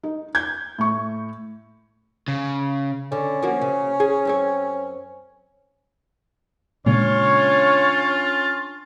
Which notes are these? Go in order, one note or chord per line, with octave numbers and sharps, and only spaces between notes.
D#4
G6 G#6
A2 C#6
C#3
D3 C#4
F3 A#3 F#4
C#3
G#4
F#2 C4 C#5
A#2 C#3 G#3 C#4 D4 F4 C#5